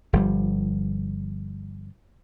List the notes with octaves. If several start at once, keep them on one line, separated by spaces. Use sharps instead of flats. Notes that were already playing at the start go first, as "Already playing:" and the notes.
G1 F3 G3